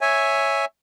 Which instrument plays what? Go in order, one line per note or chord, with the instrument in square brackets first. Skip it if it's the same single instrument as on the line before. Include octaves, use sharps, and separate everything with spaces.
[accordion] C#5 E5 G#5